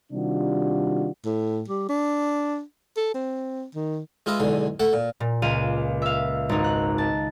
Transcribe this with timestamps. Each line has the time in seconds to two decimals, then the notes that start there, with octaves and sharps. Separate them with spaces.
0.13 C3 D#3 G3 D4 F4 F#4
1.25 A2
1.68 G3
1.89 D4
2.97 A4
3.14 C4
3.75 D#3
4.26 G#3 F4 B4 D#5 E5
4.40 B1 E2 D3 G#3
4.80 A3 A4 E5 F#5
4.93 A#2
5.20 A#2
5.42 C#2 F5 D#7
6.02 E5 F5
6.49 G#1 D#4
6.64 F#6
6.98 A5